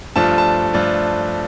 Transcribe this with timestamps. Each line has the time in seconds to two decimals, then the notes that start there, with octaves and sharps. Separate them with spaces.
0.16 G2 F3 A3 D4 F4 A5
0.38 A5
0.73 G2 F3 A3 D4 F4